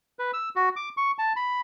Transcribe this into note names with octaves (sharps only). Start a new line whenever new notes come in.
B4
E6
F#4
D6
C#6
A5
B5